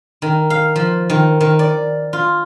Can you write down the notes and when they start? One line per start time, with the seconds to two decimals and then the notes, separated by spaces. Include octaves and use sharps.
0.22 D#3
0.50 F5
0.76 F3
1.10 D#3
1.41 D#3
1.59 D5
2.13 F4